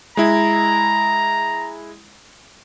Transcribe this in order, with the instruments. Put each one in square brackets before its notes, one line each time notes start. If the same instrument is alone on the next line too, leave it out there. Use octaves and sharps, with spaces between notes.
[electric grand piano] G#3 E4 [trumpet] A#5